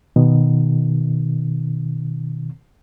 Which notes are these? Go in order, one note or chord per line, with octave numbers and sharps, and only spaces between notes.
B2 D#3